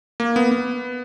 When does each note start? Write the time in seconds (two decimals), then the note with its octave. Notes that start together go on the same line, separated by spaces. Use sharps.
0.20 A#3
0.36 B3
0.51 B3